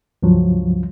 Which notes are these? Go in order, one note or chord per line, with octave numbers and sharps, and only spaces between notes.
C#2 G2 F3 F#3